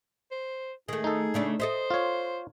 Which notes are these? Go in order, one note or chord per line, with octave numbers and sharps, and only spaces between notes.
C5
D#3 A3 G#4
D#4 A4
C#3 A3 D4
A4 C5 D#5 E5
F4 C#5